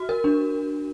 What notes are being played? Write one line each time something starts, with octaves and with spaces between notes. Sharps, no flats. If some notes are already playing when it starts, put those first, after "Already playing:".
Already playing: F#4
A#4
D4